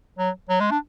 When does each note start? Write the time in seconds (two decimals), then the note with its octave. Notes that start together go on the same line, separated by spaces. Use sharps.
0.19 F#3
0.49 F#3
0.60 G#3
0.71 D4